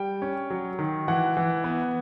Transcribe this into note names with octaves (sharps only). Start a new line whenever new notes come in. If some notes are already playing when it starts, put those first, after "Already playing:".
Already playing: G3 G5
C#4
F#3
D#3
E3 F#5
E3
B3